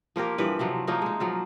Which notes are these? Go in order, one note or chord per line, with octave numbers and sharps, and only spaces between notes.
F3 A#3 G4 A#4
G2 E3 F3 B4
C3 F3 F#3
F3 A3 A#3 D#4
G#3 D#4
F3 F#3 F4